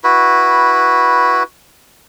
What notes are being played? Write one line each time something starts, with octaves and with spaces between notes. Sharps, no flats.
E4 F#4 B4